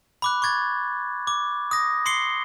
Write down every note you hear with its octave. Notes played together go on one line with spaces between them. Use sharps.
B5 D6 F#6
C#6 D6 G#6 A6
D6
D#6 A#6
C6 D#6 C7 C#7 G7